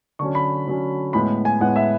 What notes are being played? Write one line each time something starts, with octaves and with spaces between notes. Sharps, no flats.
D3 F#3 C#4 C#6
B5
D3 F#3 C#4
A2 G#3 B3 B5
G#5
A2 G#3 B3 F#5
E5